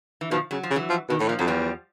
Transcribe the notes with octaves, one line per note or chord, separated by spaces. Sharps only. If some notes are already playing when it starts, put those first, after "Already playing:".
E3
B2 D#3 F3
C#3 F#3
F3
C#3
E3 F#3
F3
B2 D#3
A2 E3
A#2 F3
F2 F#3
E2 F3 G3